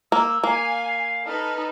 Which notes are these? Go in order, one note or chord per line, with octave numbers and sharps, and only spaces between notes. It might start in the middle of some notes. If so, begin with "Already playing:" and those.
A#3 E6
A#3 F5 G#5
D#4 A4 B4 F6